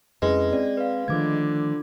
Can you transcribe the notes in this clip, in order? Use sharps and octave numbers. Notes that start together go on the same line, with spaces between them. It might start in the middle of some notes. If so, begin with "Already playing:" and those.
F2 G#3 C#4 E4 B4
C4 D5
B4 F5
D3 D#3 F3 A3 F4 D6 G#6